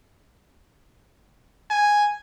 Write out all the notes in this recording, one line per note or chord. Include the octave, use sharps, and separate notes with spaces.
G#5